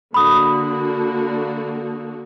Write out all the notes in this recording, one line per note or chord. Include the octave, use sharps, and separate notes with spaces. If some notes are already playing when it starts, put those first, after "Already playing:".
D3 A#3 F#4 B5 D#6